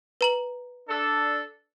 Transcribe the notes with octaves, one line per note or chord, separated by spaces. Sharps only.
B4 A#5 F#7
D4 A4